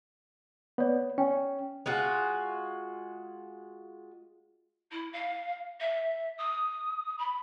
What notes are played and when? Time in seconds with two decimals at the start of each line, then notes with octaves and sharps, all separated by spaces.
0.78 B3 C#5 D5
1.18 C#4 G5
1.86 G#3 F4 F#4
4.92 E4
5.13 F5
5.80 E5
6.38 D#6
7.18 B5